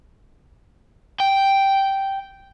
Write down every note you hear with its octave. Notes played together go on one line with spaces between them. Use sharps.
G5